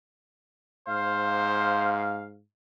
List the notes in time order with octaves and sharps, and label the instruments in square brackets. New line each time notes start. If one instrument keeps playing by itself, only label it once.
[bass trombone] G#2 [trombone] C5 [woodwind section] F5